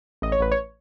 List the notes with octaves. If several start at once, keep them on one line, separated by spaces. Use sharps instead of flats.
A1 D#5
C#5
A1 B4
C#5